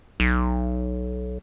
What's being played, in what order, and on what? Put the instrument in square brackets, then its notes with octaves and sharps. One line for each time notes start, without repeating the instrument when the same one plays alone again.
[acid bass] B1